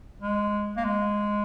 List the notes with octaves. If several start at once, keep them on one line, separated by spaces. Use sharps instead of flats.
G#3
A#3
G#3